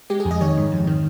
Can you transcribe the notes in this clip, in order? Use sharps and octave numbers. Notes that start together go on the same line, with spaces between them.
G#3 G4
G#4
F2
D#5
D#3 C#5
G#2
F2
D#3